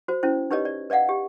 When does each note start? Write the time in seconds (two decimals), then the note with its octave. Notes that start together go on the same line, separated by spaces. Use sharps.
0.08 F#4 C5
0.23 C#4 E4 C5
0.51 D#4 G4 B4 C#5 D#5
0.65 D5
0.90 B4 D5 D#5 F5 F#5
1.09 G4